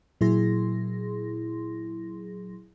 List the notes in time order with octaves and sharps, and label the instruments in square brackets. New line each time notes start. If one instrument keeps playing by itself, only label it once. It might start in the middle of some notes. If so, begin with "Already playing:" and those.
[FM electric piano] A#2 F#3 E4 G#4 C6 A#6